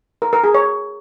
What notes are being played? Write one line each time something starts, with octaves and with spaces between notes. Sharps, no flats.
A#4
A#4
G#4
C#5